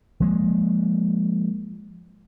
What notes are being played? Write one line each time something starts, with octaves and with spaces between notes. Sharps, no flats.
F3 G#3 A#3